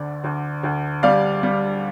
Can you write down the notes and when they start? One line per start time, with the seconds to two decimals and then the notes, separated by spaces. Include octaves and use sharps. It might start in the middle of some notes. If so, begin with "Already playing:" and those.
Already playing: D2 D3 D5
0.24 D2
0.63 D2
1.03 G3 D5 F5
1.43 G3